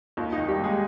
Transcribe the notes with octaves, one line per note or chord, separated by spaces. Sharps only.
D#2 F4
D#4
D#3
G3 G4
D#2 G#3 G#4